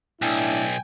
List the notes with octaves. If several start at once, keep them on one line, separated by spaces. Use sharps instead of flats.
B1 A2 D4 E4 G5 G#5